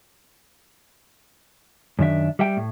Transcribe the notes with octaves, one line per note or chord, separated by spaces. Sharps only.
F#2 D#3 D4 E5
G3 E5 G5
A2